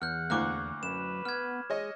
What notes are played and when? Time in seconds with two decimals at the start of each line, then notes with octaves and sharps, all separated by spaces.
0.02 E2 F#5 F6 G6
0.30 D2 A2 A#3 C#6 D6 F#6
0.83 F#2 B4 E7
1.25 B3 F6 G#6
1.70 G#3 C#5 D#5